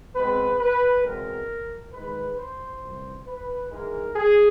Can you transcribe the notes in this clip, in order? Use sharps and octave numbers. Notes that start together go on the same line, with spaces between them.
B2 G#3 C4 B4
B4
E2 B2 G#3 C4 A#4
G#2 D#3 G#3 B4
C5
C2 C3 E3
B4
G#2 E3 G#3 A#4
G#4